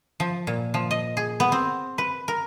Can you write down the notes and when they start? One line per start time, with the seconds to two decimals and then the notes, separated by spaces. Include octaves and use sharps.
0.20 F3
0.47 A#2
0.74 F3
0.91 D#5
1.17 G#4
1.40 B3
1.52 C4
1.98 B4
2.28 A#4